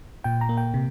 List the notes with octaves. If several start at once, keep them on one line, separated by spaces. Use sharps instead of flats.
A#2 G5
A#5
A#3
G5
C3